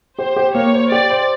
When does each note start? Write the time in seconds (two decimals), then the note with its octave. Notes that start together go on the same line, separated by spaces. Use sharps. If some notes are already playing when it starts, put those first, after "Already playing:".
0.18 G4 C5
0.36 G4
0.55 A#3 C#5
0.73 C5
0.91 G4 D5
1.10 C5